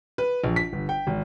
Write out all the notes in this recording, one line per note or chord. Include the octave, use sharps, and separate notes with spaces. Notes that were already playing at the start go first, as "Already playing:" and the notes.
B4
A#1
B6
G1
G5
G#1